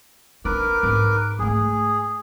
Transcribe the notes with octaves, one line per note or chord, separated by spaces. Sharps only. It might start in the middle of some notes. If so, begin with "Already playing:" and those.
D4 A#4 B4 D6
G#2 D#4
G#2 A3 G#4